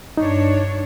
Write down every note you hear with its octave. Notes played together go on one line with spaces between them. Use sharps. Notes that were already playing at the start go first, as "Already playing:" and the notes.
G2 D4 D#4 C#5